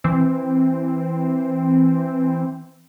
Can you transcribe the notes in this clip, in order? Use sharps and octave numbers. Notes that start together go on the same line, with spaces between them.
E3 C4